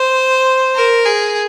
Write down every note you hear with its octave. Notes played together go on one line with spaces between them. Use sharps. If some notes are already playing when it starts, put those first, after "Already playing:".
Already playing: C5
A#4
G#4